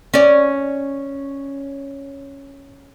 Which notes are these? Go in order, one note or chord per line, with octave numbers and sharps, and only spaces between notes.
C#4 D5